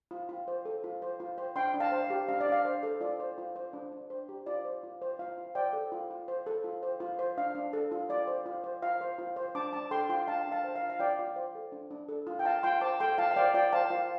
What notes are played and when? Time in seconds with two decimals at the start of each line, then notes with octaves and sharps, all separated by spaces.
0.11 F4
0.29 F4
0.48 C5
0.65 A4
0.84 F4
1.02 C5
1.20 F4
1.38 C5
1.56 D4 G5 C6
1.74 D4
1.80 F5 A5
1.92 C5
2.04 F5
2.10 G4
2.28 D4 F5
2.40 D5
2.47 D4
2.52 F5
2.65 C5
2.83 A4
3.01 F4 D5
3.20 C5
3.38 F4
3.56 C5
3.73 D4
3.92 D4
4.10 C5
4.29 G4
4.46 F4 D5
4.65 C5
4.83 F4
5.02 C5
5.19 F4 F5
5.38 F4
5.55 C5 D5 G5
5.73 A4
5.92 F4
6.11 F4
6.28 C5
6.47 A4
6.64 F4
6.83 C5
7.00 F4
7.19 C5
7.37 D4 F5
7.55 D4
7.73 A4
7.92 F4
8.09 F4 D5
8.27 C5
8.46 F4
8.64 C5
8.82 F4 F5
9.01 C5
9.18 F4
9.36 C5
9.55 D4 A5 D6
9.73 D4 A5 D6
9.91 A4 G5 C6
10.09 F4 G5 C6
10.27 D4 F5 A5
10.46 D4
10.52 F5 A5
10.64 C5
10.76 F5
10.82 F4
10.90 F5
11.00 F4 D5 G5
11.19 F4
11.36 C5
11.55 A4
11.72 D4
11.91 D4
12.09 A4
12.27 F4
12.39 G5
12.45 F4 F5 A5
12.63 F4 G5 C6
12.81 C5 A5 D6
13.00 A4 G5 C6
13.18 F4 F5 A5
13.31 F5
13.36 C5 D5 G5
13.54 F4 D5 G5
13.73 C5 F5 A5
13.90 F4 F5